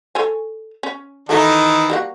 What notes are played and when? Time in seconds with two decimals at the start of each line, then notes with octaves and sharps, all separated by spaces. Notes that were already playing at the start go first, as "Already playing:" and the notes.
0.15 A4 C#5 G#5
0.83 C#4
1.29 D#3 E3 D#4 E4 F#4 A4
1.90 G3 A#3 F#4